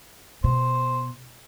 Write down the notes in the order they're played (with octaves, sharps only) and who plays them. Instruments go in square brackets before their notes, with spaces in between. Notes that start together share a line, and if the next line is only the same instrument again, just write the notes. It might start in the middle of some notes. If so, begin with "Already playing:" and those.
[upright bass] B2 [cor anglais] C5